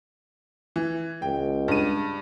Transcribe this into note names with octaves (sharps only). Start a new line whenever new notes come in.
E3
C#2 G5
G2 D#7